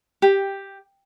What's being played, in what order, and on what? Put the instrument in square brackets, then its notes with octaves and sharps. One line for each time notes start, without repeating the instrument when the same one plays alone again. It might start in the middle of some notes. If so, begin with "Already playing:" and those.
[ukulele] G4